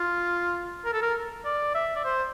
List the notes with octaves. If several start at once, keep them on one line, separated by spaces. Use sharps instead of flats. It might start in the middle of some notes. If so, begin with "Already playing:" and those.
Already playing: F4
A#4
A4
A#4
D5
E5
D5
C5